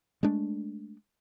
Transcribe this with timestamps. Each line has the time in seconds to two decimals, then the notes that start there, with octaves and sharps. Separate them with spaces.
0.23 G#3 A3 D4